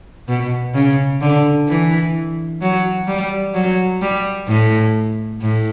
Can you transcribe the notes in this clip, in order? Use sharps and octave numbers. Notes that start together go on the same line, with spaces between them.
B2
C#3
D3
E3
F#3
G3
F#3
G3
A2
A2